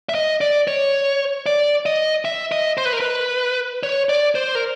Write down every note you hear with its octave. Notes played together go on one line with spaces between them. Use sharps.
E5
D#5
D5
C#5
D5
D#5
E5
D#5
C5
B4
A#4
B4
C#5
D5
C5
A#4